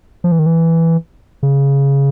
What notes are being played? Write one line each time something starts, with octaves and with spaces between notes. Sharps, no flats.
F3
E3
D#3
E3
C#3